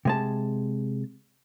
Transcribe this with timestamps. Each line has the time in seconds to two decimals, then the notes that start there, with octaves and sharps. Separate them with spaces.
0.05 C3 G#3 A5